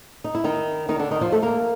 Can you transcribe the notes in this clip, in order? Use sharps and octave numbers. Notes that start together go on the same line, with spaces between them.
D#4
E4
D#3 D#4
D#3 D#4
D3 D4
D#3 D#4
F3 F4
A3 A4
A#3 A#4